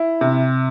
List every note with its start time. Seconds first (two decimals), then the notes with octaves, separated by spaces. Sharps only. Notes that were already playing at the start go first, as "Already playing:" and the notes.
Already playing: E4
0.21 C3